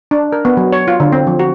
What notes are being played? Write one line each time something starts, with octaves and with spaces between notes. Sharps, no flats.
D4
A#4
B3
F#3
C#5
F4
D3
C4
F3
F#4